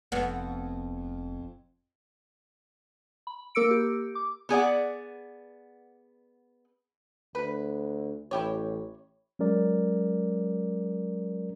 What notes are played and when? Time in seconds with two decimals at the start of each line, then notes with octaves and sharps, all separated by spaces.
0.12 F1 F2 B3
3.27 B5
3.55 A#3 A#4 D6 E6 C#7 D7
3.71 G4
4.15 D6
4.49 B3 G#4 D5 F#5
7.35 D2 B4
8.31 A1 E4 G4 C#5
9.39 F#3 G#3 C#4 A#4 D5